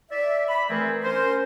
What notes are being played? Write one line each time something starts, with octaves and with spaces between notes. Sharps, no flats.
D5 E5
B5
E3 A3 C4 G#4 A#4
C#4 A#4 C5